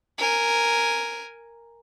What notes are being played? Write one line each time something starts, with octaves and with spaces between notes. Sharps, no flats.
A#4 G#5